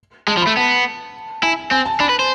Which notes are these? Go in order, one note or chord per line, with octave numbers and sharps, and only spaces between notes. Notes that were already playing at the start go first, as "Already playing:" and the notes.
G#3 A5
F3
B5
A3
B3 A5
E4 G#5
C4 G#5
A5
D4 B5
B4
C5